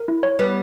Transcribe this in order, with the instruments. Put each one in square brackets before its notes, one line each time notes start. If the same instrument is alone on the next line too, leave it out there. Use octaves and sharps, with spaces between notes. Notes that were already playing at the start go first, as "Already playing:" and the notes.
Already playing: [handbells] A#4
E4
C#5
[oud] G3 B3 [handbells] B4